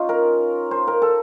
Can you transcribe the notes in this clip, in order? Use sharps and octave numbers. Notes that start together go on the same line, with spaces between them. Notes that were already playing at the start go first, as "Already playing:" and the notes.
Already playing: C#4 D#4 F4
A#4
C5
A#4
A4